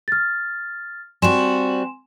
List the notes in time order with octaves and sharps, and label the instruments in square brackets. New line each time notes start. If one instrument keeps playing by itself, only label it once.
[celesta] F6 A6
[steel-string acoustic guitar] G3 C4 F#4 [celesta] G#5 C6 E7